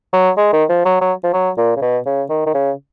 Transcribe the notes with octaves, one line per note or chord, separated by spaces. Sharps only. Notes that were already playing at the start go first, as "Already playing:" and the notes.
F#3
G#3
D#3
F3
F#3
F#3
F3
F#3
A#2
C#3
B2
C#3
D#3
D#3
C#3